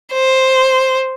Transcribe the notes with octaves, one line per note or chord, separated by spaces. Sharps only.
C5